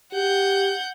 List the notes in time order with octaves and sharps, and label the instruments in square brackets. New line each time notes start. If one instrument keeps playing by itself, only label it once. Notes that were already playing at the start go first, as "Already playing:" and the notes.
[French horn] G4 [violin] F#5 G6